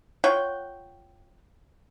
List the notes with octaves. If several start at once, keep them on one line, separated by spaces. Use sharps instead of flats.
F4 C#5 F#5 G5